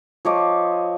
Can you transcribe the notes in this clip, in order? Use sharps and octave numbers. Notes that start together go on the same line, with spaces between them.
F3 C#5 D#5 D6